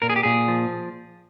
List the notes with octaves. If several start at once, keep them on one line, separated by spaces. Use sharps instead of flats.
A#2 A#4
G#4
G4
A#2 G#4
F3